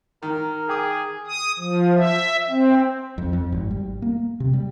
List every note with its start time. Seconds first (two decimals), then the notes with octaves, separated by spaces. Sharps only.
0.23 D#3 A#4
0.69 G#4 G5 D6 D#6
1.27 D#6
1.59 F3
1.95 E5
2.49 C4
3.18 F2
3.33 F2
3.52 G#1
3.71 G3
4.02 A#3
4.40 C3
4.53 G3